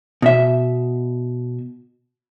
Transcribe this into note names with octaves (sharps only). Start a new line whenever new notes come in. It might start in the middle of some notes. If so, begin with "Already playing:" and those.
B2 E5